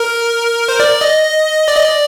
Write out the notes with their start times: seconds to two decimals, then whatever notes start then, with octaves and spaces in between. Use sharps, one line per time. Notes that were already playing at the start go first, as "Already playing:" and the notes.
Already playing: A#4
0.68 C5
0.80 D5
1.01 D#5
1.68 D5
1.76 D#5
1.85 D5